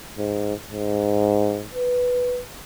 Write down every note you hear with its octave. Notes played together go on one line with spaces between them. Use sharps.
G#2
G#2
B4